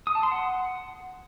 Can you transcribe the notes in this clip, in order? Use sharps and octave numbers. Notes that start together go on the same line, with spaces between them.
D#6
A5
C6
F#5